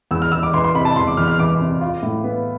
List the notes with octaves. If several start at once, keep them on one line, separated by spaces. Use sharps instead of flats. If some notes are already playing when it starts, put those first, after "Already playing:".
E2 E6
F6
E2 E6
D6
E3 C6
C6
C3 B5
A5
E2 C6
D6
E2 F6
F6
E3 D6
C3
F4
A2
B3